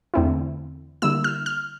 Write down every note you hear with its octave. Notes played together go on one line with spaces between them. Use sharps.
E2 D3 A3 C4 E4
D3 G3 A#3 E4 E6
F6
F6